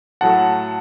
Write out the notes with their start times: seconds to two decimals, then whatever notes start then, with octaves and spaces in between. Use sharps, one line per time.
0.21 A2 F#3 A3 F#5 A5